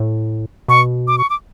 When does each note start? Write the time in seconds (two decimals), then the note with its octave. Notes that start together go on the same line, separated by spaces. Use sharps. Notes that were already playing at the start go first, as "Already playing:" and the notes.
Already playing: A2
0.68 B2 C#6
1.07 D6
1.18 C#6
1.30 D6